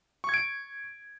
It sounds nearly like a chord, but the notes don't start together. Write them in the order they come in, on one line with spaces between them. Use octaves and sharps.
C#6 G#6 D7